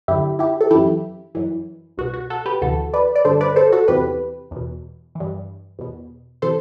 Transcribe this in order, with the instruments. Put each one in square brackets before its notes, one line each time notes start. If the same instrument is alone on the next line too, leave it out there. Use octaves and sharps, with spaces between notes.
[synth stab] F#2 D3 E4 G4
E4 G4
A4
F#2 E3 E4 G4
F#2 E3
C2 B2 F#4
F#4
F#4 A4
G4 B4
D2 C3 E3 F#4 A4
B4 D5
D5
G2 D3 A4 C5
B4 D5
A4 C5
F#4 A4
E2 C3 E3 G4 B4
E2 B2
G2 E3
E2 B2
C3 E3 A4 C5